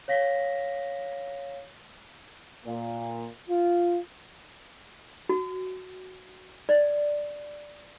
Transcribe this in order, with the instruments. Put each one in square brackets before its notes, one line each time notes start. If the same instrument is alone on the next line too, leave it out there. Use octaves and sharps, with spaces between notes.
[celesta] C#5 F5 A#6 B6
[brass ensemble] A#2
F4
[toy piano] F#4
D5